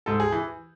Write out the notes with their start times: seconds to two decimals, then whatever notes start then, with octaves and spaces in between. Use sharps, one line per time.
0.06 G#2 A4
0.20 G#4
0.32 E3